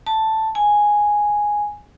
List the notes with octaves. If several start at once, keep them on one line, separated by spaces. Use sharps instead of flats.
A5
G#5